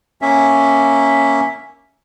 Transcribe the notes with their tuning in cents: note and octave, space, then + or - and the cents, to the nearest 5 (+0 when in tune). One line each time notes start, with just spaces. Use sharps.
A#3 +5 C#4 +0 E5 +0